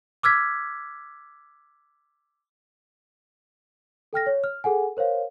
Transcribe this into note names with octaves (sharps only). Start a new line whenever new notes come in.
D6 E6 F6 G#6 B6
A4 G5 F6 A#6
C#5
F6
G#4 A4 F#5 G#5
A#4 C5 C#5 F5